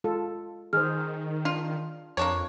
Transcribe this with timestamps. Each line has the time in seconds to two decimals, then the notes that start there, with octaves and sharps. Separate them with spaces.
0.04 G#3 F4 A4
0.73 D#3 G#4 C5 F6
1.45 D4 F4
2.17 F2 A#3 D4 C#5